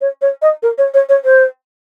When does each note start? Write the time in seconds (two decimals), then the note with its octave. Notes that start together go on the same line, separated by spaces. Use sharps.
0.01 C#5
0.21 C#5
0.41 D#5
0.62 A#4
0.78 C#5
0.94 C#5
1.09 C#5
1.24 C5